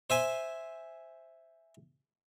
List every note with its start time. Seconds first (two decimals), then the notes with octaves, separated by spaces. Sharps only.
0.10 C5 E5 G#5